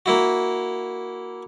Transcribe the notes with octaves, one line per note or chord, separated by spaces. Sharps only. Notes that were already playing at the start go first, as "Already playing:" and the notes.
A#3 E4 F#4